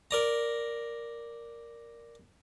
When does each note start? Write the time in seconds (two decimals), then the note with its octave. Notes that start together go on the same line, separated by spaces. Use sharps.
0.11 A#4 D5 A#5